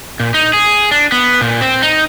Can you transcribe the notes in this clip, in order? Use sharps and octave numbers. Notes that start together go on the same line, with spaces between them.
A#2
D#4
G#4
D4
B3
A#2
C4
D#4